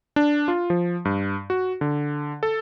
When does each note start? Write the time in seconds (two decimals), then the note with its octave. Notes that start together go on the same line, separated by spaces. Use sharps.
0.16 D4
0.48 F4
0.70 F3
1.05 G2
1.50 F#4
1.81 D3
2.43 A4